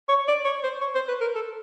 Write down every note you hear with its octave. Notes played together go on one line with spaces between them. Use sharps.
C#5
D5
C#5
C5
C#5
C5
B4
A#4
A4